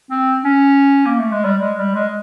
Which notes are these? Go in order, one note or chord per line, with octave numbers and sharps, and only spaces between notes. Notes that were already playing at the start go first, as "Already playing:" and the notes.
C4
C#4
A#3
A3
G#3
G3
G#3
G3
G#3